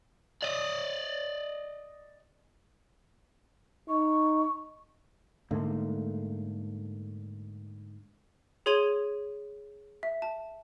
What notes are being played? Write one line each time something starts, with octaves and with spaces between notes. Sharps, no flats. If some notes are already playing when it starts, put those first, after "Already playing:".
D5 D#5
D#4 C#6
G#2 D3 A3 A#3
G#4 C#5 C6 G#6 D#7 F7
E5
A5